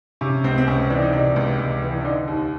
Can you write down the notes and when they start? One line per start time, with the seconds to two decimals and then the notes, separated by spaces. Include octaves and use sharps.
0.21 C3 C#4
0.44 C#2 C4
0.58 C4
0.67 C#2 C#4
0.90 E3 D4
1.02 D#4
1.13 C3 D4
1.36 C#2
1.59 C#2
1.82 E3
2.01 D4
2.05 D3 D#4
2.28 D#2